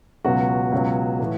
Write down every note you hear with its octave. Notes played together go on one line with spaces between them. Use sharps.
C#2 B2 F#3 F#4
C#2 B2 F#3
A2 E3